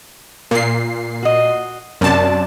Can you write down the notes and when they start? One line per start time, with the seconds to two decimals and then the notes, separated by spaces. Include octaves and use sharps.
0.51 A#2 C7
1.23 F#4 D#5
2.01 F#2 C3 D4 D5 A5